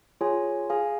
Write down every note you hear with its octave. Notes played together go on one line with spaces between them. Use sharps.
F4 G#4 C#5 G#5
G#4 F5 G#5